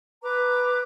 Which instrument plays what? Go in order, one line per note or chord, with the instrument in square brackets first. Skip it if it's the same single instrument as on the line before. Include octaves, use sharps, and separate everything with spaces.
[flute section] B4 A#5 D6